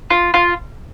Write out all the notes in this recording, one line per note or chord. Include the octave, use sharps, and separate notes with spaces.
F4
F4